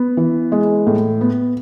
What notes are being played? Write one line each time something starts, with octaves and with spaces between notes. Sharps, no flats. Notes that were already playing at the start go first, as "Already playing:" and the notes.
Already playing: B3
E3
G#3
A2
B3